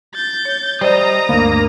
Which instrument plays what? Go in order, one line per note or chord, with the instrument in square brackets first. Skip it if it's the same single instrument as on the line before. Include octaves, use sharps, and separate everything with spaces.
[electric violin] G6 A6
[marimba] C#5
[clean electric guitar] G3 D#5 [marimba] C5 D5 [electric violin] A#5 D#6
[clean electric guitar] D2 [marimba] G2 [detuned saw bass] A#3